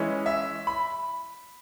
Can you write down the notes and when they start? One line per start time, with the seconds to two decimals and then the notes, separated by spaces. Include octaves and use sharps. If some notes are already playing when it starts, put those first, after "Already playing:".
Already playing: E3 G#3 C#4 E4
0.26 E5
0.67 B5